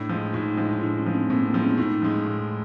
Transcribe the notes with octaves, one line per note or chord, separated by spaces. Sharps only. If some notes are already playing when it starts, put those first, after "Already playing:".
Already playing: A2 D4 E4
F3 G#3
A2 D#4 F4
F3 G#3
F4
A2 D4 E4
C#4 D#4
F3 G#3
C4 D4
A2 A#3 C4
A#3 C4
F3 G#3
B3 C#4
A2 D#4 F4
F3 G#3
A2